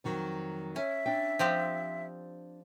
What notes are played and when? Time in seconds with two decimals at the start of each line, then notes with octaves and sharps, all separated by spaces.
0.04 F2 D#3 F#3
0.76 C#4 E5
1.06 D4 G5
1.39 F3 C4 G4